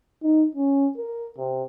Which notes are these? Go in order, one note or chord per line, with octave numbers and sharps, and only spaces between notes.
D#4
C#4
A#4
C3